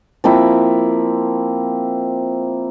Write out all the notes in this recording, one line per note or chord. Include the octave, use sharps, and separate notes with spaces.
F3 A#3 C4 E4